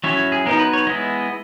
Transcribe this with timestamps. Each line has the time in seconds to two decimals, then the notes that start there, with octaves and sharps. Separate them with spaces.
0.04 F#3 C#4 E4 C#5
0.32 G#4
0.46 F#3 B3 D#4 A#4
0.59 B4
0.73 C#5
0.87 G#3 B3 E4 D#5